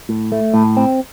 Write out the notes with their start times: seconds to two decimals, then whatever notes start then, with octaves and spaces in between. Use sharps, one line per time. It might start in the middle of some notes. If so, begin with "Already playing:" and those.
0.09 A2
0.32 A3
0.54 A2
0.77 C4